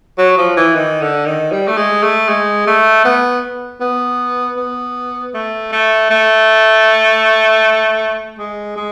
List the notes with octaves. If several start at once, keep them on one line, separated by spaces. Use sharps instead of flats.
F#3
F3
E3
D#3
D3
D#3
G3
A3
G#3
A3
G#3
A3
B3
B3
B3
A3
A3
A3
G#3
G#3